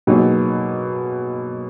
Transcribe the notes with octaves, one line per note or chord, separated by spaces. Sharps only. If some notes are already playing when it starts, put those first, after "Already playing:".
B2 F#3 A#3 D#4 G#4